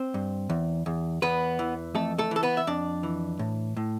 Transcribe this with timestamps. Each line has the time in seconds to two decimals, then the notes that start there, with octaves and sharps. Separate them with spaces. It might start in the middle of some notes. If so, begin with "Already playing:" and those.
Already playing: C4 C5
0.14 G2
0.50 E2
0.86 E2
1.22 E2 B3 B4
1.59 E3
1.95 F2 A3 A4
2.18 A3 A4
2.31 E3 A4
2.43 B3 B4
2.57 E5
2.67 F2 D4 D5
3.03 E3
3.39 A2
3.77 A2